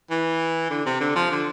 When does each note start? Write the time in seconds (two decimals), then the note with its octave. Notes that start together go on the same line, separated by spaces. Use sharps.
0.10 E3
0.71 D3
0.86 C3
1.00 D3
1.16 F3
1.31 D3